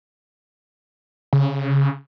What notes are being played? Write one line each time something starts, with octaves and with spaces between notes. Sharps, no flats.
C#3